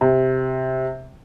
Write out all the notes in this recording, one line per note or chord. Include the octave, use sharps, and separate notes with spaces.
C3